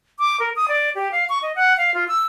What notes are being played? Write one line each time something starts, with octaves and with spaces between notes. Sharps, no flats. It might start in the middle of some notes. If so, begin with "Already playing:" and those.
D6
A#4
D#6
D5
G4
F5
C#6
D#5
F#5
F5
F4
E6